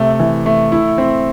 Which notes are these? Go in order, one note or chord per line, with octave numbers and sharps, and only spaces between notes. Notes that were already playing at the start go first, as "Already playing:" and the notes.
Already playing: C3 A3
E3
A3
E4
C4